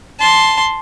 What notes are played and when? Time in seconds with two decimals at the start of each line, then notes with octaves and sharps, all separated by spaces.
0.19 A5 C6